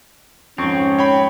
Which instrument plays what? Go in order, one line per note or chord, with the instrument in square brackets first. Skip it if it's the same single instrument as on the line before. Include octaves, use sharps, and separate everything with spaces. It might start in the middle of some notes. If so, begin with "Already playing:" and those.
[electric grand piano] F2 C#6 [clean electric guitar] G#2 C4 [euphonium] C#4
[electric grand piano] C#5 G5 B5